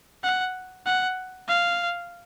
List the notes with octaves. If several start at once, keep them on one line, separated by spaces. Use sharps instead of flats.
F#5
F#5
F5